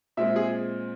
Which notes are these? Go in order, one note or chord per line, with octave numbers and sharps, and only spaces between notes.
A#2 G#3 C4 E5
G#4